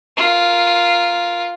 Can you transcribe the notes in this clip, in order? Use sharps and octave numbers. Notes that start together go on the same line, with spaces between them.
F4 A#4